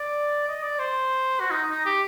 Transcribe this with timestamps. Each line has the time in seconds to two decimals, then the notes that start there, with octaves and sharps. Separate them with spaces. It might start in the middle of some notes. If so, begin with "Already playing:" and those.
Already playing: D5
0.48 D#5
0.63 D5
0.79 C5
1.40 F#4
1.51 D#4
1.70 D#4
1.85 G4